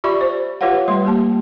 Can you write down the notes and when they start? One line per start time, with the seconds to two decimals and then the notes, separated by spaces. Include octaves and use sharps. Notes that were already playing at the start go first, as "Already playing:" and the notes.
0.04 F4 G4 D5 E5 B5 C#6
0.21 C5
0.61 F4 G4 B4 C#5 F5 F#5
0.88 G3 A3 B4 C6
1.05 A#3 G4 A5